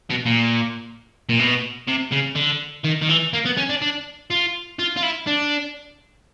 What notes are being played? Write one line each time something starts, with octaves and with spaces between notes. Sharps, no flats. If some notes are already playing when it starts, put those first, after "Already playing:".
B2
A#2
A#2
B2
C3
C#3
D3
D#3
D#3
E3
A#3
B3
C#4
D4
D4
F4
F4
F4
E4
D4